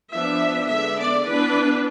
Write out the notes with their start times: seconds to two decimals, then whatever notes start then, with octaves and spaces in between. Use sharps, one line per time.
0.12 F3 B3 D4 E5
0.69 D3 G#3 B3 D4 E5
0.98 D5
1.25 E3 B3 D4 B4